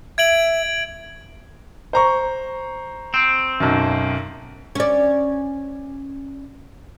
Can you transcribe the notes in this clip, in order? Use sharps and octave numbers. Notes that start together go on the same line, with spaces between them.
E5 G#6 D7 F#7
C5 A#5 C#6
C4
B1 F#2
C#4 D5